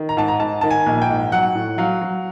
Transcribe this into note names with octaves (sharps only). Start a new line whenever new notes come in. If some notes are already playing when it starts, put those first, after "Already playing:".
Already playing: D#3
A#5
G#2 A5
A#5
G#2 A5
D#3 A5
G#5
A#1
G5
G#2
F#3 F#5
A2
F#3 F5
F#3